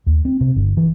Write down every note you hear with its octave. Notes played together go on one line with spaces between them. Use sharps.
D#2
C4
C3
G1
E3